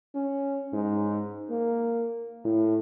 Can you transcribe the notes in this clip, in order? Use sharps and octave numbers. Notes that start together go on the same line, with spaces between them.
C#4
G#2
A#3
A2